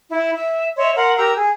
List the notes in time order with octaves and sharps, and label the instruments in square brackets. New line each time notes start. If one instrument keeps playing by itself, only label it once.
[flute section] E4
E5
C#5 D#5 E5 C6
A#4 F5 F#5 C6
G4 A#4 A#5 E6
G#4